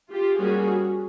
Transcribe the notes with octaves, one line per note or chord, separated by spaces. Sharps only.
F4 G4
G3 A#3 C#4 F#4 G#4